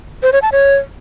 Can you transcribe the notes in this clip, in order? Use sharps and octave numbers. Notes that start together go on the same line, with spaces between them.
C5
C#5
A5
C#5